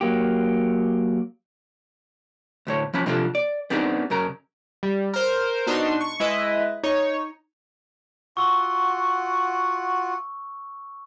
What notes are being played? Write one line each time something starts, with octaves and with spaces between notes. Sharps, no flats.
F#3 A#3 G4
D2 A2 C#5
F3 C#4 B5
C3 F3 D4 F4 G4 A4
D5
B3 C4 D4 D#4 G#4
F#2 C#3 A#4 A#5
G3
A#4 C5
B2 D4 D#4 C6
C#6
G#3 E4 B4 D#5 E5
D#4 C#5
F4 F#4 F#5 C#6 E6 G7